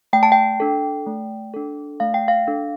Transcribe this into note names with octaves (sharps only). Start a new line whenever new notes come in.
A3 G5
A5
G5
D4 A4
A3
D4 A4
A3 F5
G5
F5
D4 A4